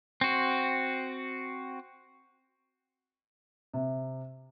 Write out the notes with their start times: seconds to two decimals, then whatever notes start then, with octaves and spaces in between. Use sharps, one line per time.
0.21 C4 F#4
3.73 C3